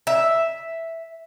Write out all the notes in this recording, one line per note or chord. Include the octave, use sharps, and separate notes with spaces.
E5